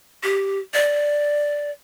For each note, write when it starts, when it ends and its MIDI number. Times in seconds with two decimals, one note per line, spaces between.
0.23 0.59 67
0.74 1.71 74